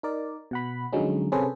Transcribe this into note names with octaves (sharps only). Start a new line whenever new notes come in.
D#4 A#4 D5
B2 F#5 B5
D3 F3 F#3 G#3 C#4 D#4
C3 C#4 G#4 A4 B4 C5